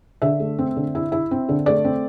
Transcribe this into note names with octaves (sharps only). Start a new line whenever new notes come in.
D3 E5
A3
C4
D3
E4
E4
C4
D3
A3 D5
C4